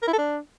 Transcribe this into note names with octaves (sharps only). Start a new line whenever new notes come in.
A#4
E4
A4
D4